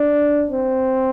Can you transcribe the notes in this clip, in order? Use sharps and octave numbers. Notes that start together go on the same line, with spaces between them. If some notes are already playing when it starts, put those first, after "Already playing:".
Already playing: D4
C4